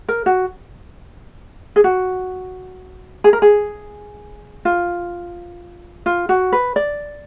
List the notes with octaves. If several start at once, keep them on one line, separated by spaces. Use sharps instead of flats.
A#4
F#4
G#4
F#4
G#4
A#4
G#4
F4
F4
F#4
B4
D5